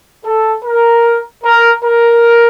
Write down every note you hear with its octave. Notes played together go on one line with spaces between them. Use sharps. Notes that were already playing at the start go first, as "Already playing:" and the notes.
A4
A#4
A#4
A#4